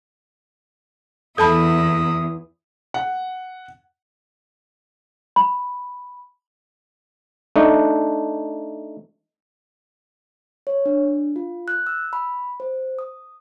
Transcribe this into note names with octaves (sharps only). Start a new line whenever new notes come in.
E2 E3 E4 A4 A5 B5 D#6
F#5
B5
A3 D4 D#4
C#5
D4
F4
F#6
E6
B5
C5
D#6